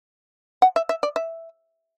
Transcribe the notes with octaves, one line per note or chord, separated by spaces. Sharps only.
F#5
E5
E5
D5
E5